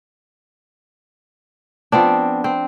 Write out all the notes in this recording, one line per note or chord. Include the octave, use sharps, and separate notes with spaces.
F3 B3 C4 D4
C4